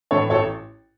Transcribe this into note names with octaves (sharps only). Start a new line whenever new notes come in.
A2 E3 A4 C#5
A1 A4 C#5